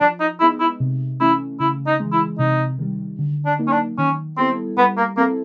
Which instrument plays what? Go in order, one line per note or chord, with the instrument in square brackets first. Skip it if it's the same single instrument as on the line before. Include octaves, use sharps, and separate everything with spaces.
[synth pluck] F3 [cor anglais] D4
[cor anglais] D#4
[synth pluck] G#3 B3 D#4 [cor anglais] E4
[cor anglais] E4
[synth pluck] C3
[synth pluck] E3 A3 C#4 [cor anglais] E4
[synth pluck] C#3 [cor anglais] E4
[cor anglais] D#4
[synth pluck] E3 G#3
[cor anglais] E4
[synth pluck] C3 [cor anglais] D#4
[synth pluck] D#3 G3
D3
[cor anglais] D4
[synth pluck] F#3 A#3 D#4
[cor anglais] C#4
D4
[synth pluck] D#3 [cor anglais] C#4
[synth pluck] G3 B3 E4 A4 [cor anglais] C4
[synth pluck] G3 [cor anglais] B3
[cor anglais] A#3
[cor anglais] A#3 [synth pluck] C4 E4 A4